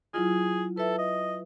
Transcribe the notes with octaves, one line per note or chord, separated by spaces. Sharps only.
F#3 E4 F4 G#4
A4 B4 E5
D#5